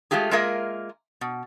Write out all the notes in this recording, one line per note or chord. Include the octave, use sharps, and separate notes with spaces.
G#3 A3 F4 G4 G#4
G#3 A#3 F4 G#4 A#4 E5
B2